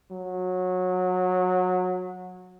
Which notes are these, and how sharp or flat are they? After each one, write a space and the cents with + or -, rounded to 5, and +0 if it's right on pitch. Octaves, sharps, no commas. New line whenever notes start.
F#3 -20